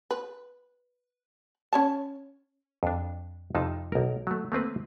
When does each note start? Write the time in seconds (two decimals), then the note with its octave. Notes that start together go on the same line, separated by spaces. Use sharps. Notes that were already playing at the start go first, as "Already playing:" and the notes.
0.11 B4
1.73 C#4 C#5 A5
2.83 F2 D4
3.55 F2 C3 D#4 F4 A5
3.92 B1 A#4
4.27 F#3 A3
4.52 A3 A#3 C4 B4